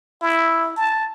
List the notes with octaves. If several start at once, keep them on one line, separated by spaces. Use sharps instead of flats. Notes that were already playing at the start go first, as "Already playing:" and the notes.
E4
A5